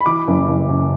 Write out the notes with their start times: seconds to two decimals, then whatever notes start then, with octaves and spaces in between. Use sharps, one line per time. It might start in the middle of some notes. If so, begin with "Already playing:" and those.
0.01 B5
0.06 E3 D6
0.28 F#1
0.48 F#1
0.69 F#2